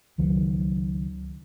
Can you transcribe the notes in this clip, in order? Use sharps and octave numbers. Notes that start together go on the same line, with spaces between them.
C#2 D#3 F#3